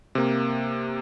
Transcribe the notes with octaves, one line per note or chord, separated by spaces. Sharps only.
C3 A#3